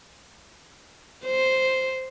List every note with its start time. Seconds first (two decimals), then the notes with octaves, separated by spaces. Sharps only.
1.25 C5